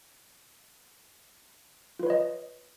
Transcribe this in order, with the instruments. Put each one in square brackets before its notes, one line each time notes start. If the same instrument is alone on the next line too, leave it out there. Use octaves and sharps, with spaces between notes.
[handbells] F4
B4
C#5
D#5